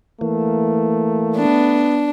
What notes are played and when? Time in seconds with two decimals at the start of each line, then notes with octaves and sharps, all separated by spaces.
0.21 E3 A3 A#3
1.36 B3 D4